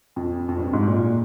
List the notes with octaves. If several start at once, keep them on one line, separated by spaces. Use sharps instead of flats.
F2
F2
G2
G#2
A#2